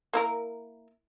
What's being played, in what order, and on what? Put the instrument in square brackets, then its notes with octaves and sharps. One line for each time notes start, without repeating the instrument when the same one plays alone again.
[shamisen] A#3 E4 A#4